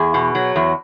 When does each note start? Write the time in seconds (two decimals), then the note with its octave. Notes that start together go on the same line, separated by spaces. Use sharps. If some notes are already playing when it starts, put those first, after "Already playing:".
Already playing: E2 G#4
0.14 B2
0.35 F#3
0.56 E2